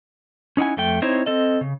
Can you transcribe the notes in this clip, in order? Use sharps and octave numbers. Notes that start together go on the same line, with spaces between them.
C#4 D#4 E4 F#5 G#5
F2 A3 G5
C4 D#4 E4 C5 C#5
C4 A4 D#5
C#3